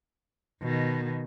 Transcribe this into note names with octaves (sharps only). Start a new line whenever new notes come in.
B2 D#3